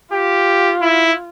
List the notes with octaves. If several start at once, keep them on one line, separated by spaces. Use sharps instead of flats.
F4 G4
E4